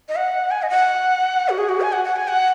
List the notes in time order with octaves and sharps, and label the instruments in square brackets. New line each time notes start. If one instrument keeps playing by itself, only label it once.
[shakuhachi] D#5
F#5
G#5
D#5
F#5
F#4
G#4
F#4
G#5
F#5
F#5
G#5
F#5